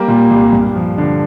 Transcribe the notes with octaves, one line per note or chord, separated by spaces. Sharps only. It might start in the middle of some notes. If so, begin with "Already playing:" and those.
Already playing: G3 A#3
A#2
C2
G2
F3
D3